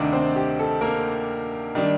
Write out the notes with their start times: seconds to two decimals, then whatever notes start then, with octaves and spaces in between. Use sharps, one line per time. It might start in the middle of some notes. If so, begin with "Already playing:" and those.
Already playing: D2 C3 D#3 D4 D5
0.13 C4 C5
0.36 G4
0.59 A4
0.81 A#3 A#4
1.75 D#3 G3 D4